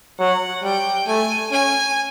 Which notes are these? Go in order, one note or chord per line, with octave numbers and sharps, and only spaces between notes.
F#3 F#5
G3 G5
A3 G#5
C#4 G#5